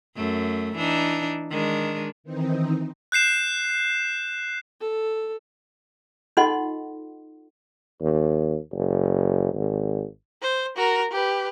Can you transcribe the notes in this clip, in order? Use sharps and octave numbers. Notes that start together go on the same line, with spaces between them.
F#2 A3
E3 D4 D#4
D#3 G#3 D4
D#3 E3 C4 D#4
F#6 G6 C7 E7
A4
D#4 F4 A4 D#5 F#5 C6
D#2
F#1
G#1
C5
F#4 A#4
G4 B4